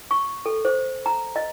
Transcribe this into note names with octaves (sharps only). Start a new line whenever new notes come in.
C#6
A4
C5
A#5
D#5